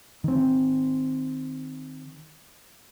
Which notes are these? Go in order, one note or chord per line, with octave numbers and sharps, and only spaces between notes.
D#3 C4